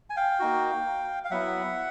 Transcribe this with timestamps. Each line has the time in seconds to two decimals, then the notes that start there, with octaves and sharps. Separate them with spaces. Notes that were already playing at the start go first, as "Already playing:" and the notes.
0.10 G#5
0.16 F5 G5
0.39 A#3 D#4 F#4
1.24 F5
1.31 F#3 B3 E4 E5 F#5